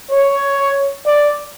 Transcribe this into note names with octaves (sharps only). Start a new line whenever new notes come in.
C#5
D5